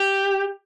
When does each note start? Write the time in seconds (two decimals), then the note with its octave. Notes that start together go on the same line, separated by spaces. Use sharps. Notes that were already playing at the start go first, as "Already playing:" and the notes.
Already playing: G4